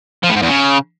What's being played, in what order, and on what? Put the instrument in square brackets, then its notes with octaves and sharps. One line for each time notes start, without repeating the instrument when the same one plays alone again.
[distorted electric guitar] F3
A2
G#2
E2
C#3